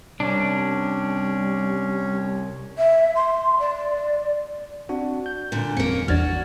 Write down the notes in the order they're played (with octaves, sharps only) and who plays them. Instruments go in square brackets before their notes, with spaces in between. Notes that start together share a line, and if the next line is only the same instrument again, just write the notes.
[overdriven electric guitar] C2 [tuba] G3 [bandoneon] C#4 [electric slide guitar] D4
[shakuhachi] E5
C6
D5
[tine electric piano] C4 D4 F#4
G6
[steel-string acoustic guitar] A#2 D3
[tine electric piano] G#1 F2 [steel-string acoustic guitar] A#3 C#4 [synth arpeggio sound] C4 C#7
[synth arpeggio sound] G#1 E2 D4 [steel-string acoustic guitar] F#4 [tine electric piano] F6 G#6 A6